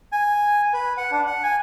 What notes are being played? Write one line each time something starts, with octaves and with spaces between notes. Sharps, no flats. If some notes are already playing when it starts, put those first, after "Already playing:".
G#5
B4
F#5
D4
F#5
G#5